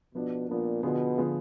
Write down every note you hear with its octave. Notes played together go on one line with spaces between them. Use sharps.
B2 F3 B3 D4
A#2 F3 B3 D4
B2 D3 F3 B3 F4 G#4
D3 F3 B3 F4 G#4